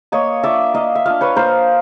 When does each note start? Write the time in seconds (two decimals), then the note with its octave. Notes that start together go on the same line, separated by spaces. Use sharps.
0.12 A#3 C#5 D#5
0.43 D4 F4 D5 E5
0.74 A#3 D#5 F5
0.95 E5
1.05 D4 F4 D#5 F5
1.21 B4 C#5
1.36 A#3 A#4 C5